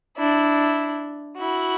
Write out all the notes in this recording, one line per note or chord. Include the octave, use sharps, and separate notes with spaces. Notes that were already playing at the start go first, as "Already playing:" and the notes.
D4 E4
E4 F#4